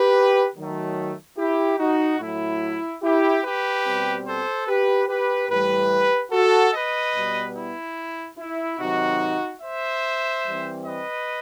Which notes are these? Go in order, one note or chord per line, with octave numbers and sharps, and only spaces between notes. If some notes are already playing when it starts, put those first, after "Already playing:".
Already playing: G4 B4
D#3 F#3 A3
E4 G4
D#4 F#4
A2 F#3 A3 E4
E4 G4
G4 B4
B2 G3 C4
A4 C5
G4 B4
G4 B4
A2 E3 G3 G4 B4
F#4 A4
B4 D#5
B2 G3 B3
E4
E4
C3 D#3 F#3 C4 D#4 F#4
C5 E5
E3 G3 C4
B4 D#5